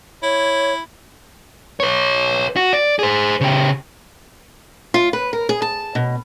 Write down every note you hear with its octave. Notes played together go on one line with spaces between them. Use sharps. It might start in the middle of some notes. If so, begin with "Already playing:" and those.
E4 C#5
B4 C#5
F#4
D5
G#4 C5
C#3 G4
F4
B4
A#4
G#4
A5
B2